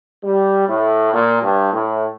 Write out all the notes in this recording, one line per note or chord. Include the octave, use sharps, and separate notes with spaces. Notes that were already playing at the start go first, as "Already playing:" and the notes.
G3
A2
A#2
G2
A2